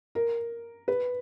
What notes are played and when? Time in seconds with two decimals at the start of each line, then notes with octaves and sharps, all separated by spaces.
0.15 A#4
0.88 B4